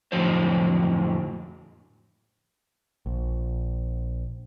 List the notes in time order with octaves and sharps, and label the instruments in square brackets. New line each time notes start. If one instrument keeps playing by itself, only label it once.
[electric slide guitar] F2 A2 D3 F3 F#3 C5
[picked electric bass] A#1